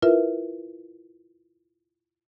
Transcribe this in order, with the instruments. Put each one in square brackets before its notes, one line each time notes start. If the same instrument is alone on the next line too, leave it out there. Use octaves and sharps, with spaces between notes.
[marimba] E4 F4 A#4 B4 E5